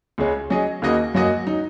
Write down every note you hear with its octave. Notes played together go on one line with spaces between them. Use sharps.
C#2 C#3 G#3 C#4
F#3 C#4 G#4 D#5
D#2 C#3 A#3 F#4 D#5
F#2 F#3 A#3 F#4 D#5
F#3 D#4